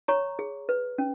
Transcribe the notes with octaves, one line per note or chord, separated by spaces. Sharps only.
C#5 A#5 C#6
G#4
B4
C#4